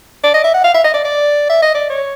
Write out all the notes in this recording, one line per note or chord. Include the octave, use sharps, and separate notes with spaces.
D5
D#5
E5
F#5
F5
E5
D#5
D5
D5
E5
D#5
D5
C#5